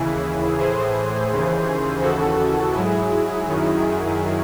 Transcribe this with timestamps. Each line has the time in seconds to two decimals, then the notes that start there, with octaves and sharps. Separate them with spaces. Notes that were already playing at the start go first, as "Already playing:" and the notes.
Already playing: D#2 C#3 E3 E4 G#4
0.57 A2 E3 G#4 C5
1.30 D#2 C#3 E3
2.01 D#2 C#3 E3 F#4 A4
2.73 G#2 F#3 E4 G#4
3.45 F#2 D#3 F#3